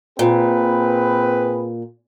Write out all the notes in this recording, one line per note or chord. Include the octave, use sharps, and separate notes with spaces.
A#2 C4 G#4 B4